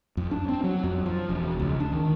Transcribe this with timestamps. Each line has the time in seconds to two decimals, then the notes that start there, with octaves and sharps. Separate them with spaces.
0.17 F2
0.31 D4
0.49 C4
0.64 F#3
0.84 F2
1.06 F3
1.29 E1
1.60 C#2
1.80 D4
1.92 D#3